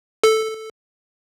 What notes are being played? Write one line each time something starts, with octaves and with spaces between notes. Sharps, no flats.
A4